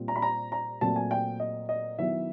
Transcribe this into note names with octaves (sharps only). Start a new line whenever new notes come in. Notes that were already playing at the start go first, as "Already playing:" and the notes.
Already playing: A#2 G3 C4 F4
A#5
B5
A#5
A#5
A#2 F#3 A3 C4 A5
G#5
G5
D#5
D#5
D#3 F#3 B3 E4 E5